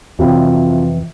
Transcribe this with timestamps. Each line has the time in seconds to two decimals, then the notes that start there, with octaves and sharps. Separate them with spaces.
0.19 F2 C3 E3 F#3 C4 F4